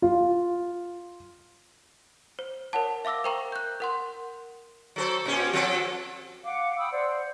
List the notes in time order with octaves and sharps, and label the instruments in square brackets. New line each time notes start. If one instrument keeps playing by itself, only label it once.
[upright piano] F4
[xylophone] C5
A#4 C#5 F#5 A5
E5 F5 D6 E6 A#6
A#4 C5 G5 A#5 C#6
F#6 G6
A#4 F#5 C6
[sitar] F#3 A4 C5
A#2 C#4 G4
F3 C4 A4
[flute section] F5 F#5 D6
G5 B5 D#6 E6
C5 D5 F#5